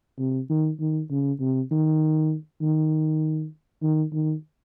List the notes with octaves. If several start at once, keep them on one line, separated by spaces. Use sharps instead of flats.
C3
D#3
D#3
C#3
C3
D#3
D#3
D#3
D#3